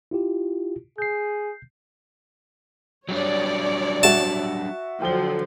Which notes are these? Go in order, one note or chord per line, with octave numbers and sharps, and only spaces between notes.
E4 F4 G4
G#4 G6 C7
F#3 G3 D4 C#5 D5
F#4 E5 A5
D3 F3 F#3 G5 G7